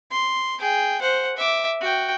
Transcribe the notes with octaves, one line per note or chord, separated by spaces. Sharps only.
C6
G#4 G5
C5 F#5
E5 D6
F#4 G5